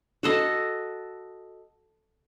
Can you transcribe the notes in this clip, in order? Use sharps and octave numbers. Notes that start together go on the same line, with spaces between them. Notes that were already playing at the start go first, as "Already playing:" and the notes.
F#4 A4 D#5